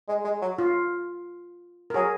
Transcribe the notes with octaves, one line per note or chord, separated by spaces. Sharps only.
G#3
G#3
F#3
F4
A#4
F#3 G#4